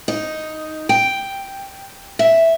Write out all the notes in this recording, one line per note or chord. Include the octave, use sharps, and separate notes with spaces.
D#4
G5
E5